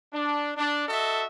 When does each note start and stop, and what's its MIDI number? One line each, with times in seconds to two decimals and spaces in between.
0.13 0.53 62
0.57 0.85 62
0.88 1.25 66
0.88 1.25 69
0.88 1.25 75
0.88 1.25 76